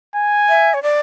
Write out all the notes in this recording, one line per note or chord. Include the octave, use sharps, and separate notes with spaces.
G#5
E5
C#5
D5